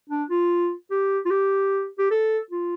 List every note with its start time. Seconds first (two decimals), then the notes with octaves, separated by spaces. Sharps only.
0.10 D4
0.30 F4
0.90 G4
1.25 F4
1.30 G4
1.99 G4
2.11 A4
2.51 F4